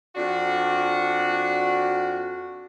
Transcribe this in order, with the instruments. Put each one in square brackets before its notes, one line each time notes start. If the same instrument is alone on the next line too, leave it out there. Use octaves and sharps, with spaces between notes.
[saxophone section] F2 D4 F#4